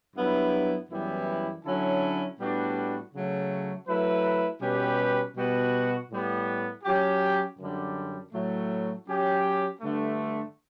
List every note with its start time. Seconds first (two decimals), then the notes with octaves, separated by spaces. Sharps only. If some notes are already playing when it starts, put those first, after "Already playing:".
0.15 G2 F#3 B3 E4
0.90 F#2 E3 G3 B3 E4
1.63 D3 F#3 C#4 E4 A4
2.38 A2 G3 B3 D4 F#4
3.12 C#3 F#3 A3
3.86 F#3 A3 E4 B4
4.61 B2 G3 C#4 G4 B4
5.35 B2 G3 B3 F#4
6.09 A2 G3 B3
6.84 F#3 C#4 G4
7.58 F#2 D3 G3
8.32 A2 F#3 A3
9.06 F#3 C#4 G4
9.81 G2 D3 A3